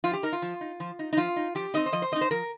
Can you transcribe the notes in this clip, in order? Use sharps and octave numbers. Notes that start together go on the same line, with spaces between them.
F3 F4
G4
D#4 A#4
F4
F3
D#4
F3
D#4
D#4
F3 F4
D#4
F3 G4
C4 D#4 D#5
C5
F3 D#5
C5
C4 D#4 D#5
C5
F3 A#4